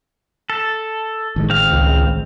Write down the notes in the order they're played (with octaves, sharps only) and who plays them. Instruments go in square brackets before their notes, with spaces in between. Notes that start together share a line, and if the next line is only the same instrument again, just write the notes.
[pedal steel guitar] A4
[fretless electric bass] A1 D#3 G#3
[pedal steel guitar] C4 F5
[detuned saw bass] C#2